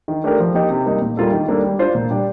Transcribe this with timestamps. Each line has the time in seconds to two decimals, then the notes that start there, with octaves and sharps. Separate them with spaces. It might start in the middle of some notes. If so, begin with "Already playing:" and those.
0.08 D#3
0.24 A3 D4 G4 A#4
0.39 F3
0.54 A#3 D#4 G4
0.70 C3
0.86 G3 A#3 D#4
1.02 A#2
1.17 G3 A#3 F4 A4
1.32 D#3
1.48 G3 A#3 D4 A4
1.64 G3
1.79 D4 F4 C5
1.95 A#2
2.10 G3 D4 G4 D5